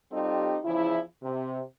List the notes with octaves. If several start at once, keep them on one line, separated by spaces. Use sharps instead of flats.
G3 C4 D#4 F4 G4 A4
E2 C#3 F3 E4
C3